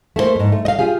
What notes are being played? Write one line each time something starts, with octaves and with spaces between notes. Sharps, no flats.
A3 A#3 G4 C5
F2 G#2
A3
D#5 F5
F4 G4 G#4 F5